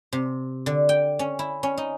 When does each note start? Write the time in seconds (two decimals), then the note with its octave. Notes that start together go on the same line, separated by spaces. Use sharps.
0.13 C3
0.66 D3
0.89 G5
1.19 C#4
1.39 E4
1.63 C#4
1.78 D#4